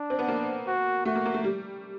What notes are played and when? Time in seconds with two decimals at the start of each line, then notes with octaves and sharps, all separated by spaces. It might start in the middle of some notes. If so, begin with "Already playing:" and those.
Already playing: D4
0.10 C4
0.19 B3
0.28 A#3
0.67 F#4
1.05 A3 F#4
1.15 A#3
1.26 A#3
1.34 A3
1.44 G3